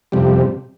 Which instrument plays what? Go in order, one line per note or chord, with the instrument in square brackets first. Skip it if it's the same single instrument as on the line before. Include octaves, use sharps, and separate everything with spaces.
[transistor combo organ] F2 C3 G3